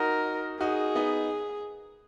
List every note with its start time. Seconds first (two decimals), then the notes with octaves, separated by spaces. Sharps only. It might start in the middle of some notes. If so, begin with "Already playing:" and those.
Already playing: D#4 F#4 A#4
0.61 D#4 F#4 G#4
0.95 B3 D#4